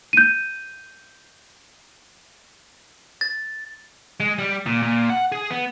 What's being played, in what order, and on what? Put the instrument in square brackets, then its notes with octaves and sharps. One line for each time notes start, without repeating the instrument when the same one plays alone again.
[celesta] G6 D#7
[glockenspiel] A6
[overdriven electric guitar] G#3
G3
A#2
A#2
F#5
G#4
B3